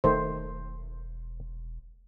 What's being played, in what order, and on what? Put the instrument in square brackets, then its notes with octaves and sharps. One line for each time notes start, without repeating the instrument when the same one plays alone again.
[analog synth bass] E1 [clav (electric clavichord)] D#3 A3 [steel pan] C5